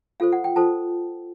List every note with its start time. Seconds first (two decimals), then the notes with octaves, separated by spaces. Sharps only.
0.20 F4 A4 C5 F5
0.32 F#5
0.44 G5
0.56 F4 A4 C5 A5